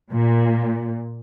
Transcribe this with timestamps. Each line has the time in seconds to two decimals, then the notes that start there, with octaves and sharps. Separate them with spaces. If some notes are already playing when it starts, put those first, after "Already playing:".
0.12 A#2